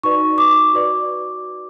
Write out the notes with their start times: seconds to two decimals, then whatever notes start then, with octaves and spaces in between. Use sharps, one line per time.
0.03 D#4 F#4 B4 D5 C#6
0.38 D6
0.74 F#4 B4 D5